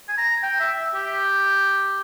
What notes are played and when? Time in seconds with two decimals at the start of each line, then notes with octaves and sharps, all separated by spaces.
0.09 G#5
0.18 A#5
0.43 G5
0.60 E5
0.78 E5
0.95 G4